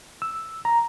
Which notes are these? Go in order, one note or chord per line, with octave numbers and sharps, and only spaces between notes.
E6
A#5